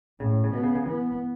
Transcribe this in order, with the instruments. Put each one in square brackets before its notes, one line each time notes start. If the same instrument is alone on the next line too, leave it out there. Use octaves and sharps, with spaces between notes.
[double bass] A2 [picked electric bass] C#3
[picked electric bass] C#3
[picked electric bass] B2 [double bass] B3
[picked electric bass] C#3
C#3
[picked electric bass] E3 [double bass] B3